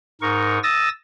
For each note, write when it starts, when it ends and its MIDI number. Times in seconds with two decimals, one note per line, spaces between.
0.22 0.59 44
0.22 0.59 63
0.22 0.59 70
0.22 0.59 85
0.63 0.89 87
0.63 0.89 88
0.63 0.89 93
0.63 0.89 94